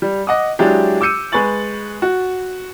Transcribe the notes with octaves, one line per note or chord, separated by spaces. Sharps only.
G3
D#5 F#5 D6 D#6
F#3 G#3 D4 E4 G4
D6 E6 G6 C#7 D#7
G#3 B4 G#5 C#6 A6 F#7
F#4